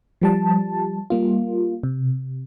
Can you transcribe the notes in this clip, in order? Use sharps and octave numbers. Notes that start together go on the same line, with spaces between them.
F3 G3 A5
G3 A#3 F4
C3